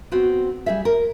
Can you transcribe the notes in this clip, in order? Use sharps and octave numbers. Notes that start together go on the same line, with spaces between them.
B3 C4 F#4
G3 G#4 E5
A#4